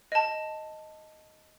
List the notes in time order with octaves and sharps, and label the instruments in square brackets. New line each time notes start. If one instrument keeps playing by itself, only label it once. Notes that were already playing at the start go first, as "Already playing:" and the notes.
[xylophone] D#5 A5